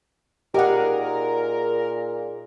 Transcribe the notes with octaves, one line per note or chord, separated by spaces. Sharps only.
A#2 D#4 G4 G#4 A#4 F#5